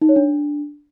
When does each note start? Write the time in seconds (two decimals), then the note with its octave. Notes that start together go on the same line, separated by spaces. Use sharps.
0.02 D#4
0.09 C#5
0.16 D4